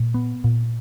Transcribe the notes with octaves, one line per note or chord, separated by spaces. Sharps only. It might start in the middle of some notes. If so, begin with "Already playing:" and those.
Already playing: A#2
B3
A#2